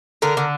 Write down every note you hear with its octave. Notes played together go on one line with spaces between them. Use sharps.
D3 A#4
D3